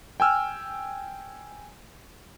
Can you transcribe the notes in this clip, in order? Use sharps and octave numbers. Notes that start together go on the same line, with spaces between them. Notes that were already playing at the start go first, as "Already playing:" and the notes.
G5 G#5 E6 F6